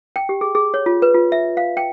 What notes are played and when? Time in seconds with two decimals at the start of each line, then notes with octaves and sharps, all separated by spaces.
0.16 G5
0.29 G4
0.41 G#4
0.55 G#4
0.74 C#5
0.86 F4
1.02 B4
1.15 F4
1.32 E5
1.57 F5
1.77 G5